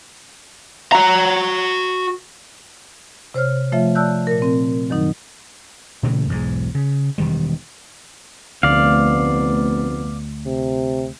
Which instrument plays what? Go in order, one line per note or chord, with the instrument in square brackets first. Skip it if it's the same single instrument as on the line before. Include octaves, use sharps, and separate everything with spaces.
[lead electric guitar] F#4 A#5
[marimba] C3 C5 C#5 F6
F3 A3 F4 C#5 E5
D5 A5 E6 F#6 G6
A#2 A#4
C4
F#2 D#3 F#3 D#4
[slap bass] A#2 C#3 E3 A3
B1 E2 G#2 G#3
C#3
E1 D#3 G3
[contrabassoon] F1 [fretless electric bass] D2 [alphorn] B3 [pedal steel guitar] D5 F5
[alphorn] C3